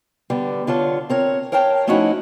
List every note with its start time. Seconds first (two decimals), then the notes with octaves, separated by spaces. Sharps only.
0.30 D3 G3 B3
0.67 D3 F4 C#5 A5
1.09 C4 A#4 C#5
1.52 A#4 C#5 F5 G5 A5
1.87 F3 A3 C#4 D#4 E4 F#4